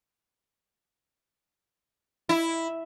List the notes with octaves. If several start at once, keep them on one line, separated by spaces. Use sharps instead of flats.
E4